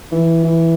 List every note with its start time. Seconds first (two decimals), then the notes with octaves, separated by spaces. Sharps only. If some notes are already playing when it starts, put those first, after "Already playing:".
0.12 E3
0.44 E3